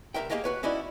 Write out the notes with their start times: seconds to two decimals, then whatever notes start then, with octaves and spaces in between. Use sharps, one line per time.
0.14 C2 F#2 A#4 E5 G5
0.30 A#3 D4 G4 G#4 D#5 F5
0.44 F#4 B4 C#5
0.63 C#4 D#4 E4 F#4 D5